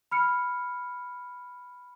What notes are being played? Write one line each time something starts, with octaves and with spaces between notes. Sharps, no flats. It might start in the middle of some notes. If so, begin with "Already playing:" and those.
B5 F6 C#7